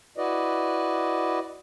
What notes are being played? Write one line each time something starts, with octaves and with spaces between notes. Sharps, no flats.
E4 F#4 B4 D5 D#5